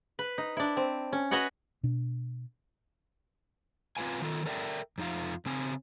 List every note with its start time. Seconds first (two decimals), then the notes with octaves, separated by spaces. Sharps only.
0.19 B4
0.38 D#4
0.57 D4 E4
0.77 C4
1.12 C#4
1.31 F#4 B4 C#5 D#5 F#5
1.83 B2 D4
3.97 C4 F4 G#4 B4 F5 G#5
4.22 D#3 F4 A4
4.46 A4 A#4 D5 E5 G5
4.98 F2 D#4 F4
5.46 C#3 C4 G#5